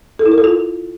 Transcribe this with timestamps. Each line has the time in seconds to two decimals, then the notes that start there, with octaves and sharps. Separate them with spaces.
0.19 A4
0.26 E4
0.32 A#4
0.38 A4
0.44 F4